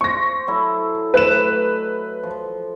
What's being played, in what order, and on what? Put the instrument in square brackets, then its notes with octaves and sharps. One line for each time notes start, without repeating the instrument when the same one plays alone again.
[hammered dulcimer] C5 [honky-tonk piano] C#6 A#6
[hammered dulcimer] F#3 E4 A4
[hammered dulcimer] F#3 A3 D#5 [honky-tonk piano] B4 E7
[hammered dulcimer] F3